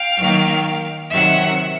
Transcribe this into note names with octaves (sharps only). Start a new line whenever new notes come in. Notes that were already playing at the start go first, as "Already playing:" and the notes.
Already playing: F5 G5
D#3 F#3 A#3
C3 D#3 F#3 E5 F#5